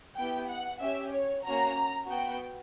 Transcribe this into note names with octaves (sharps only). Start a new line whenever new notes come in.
B3 E4 G4 G5
F#5
C#4 G4 E5
C#5
A#3 C#4 F#4 A#5
B3 F#4 G5